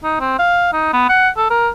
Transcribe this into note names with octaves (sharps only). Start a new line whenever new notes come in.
D#4
C4
F5
D#4
B3
F#5
A4
A#4